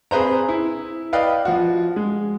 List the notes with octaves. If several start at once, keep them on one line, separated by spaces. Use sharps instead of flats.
C4 G#4 B4 C5 A#5
E4
B4 D5 D#5 F5 G5
F3 F#4
G#3